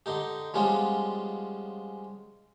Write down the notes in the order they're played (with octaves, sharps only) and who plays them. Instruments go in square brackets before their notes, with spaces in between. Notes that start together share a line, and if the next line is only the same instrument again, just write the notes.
[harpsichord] D3 D#4 G4
F3 G3 G#3 B3 C#4 F4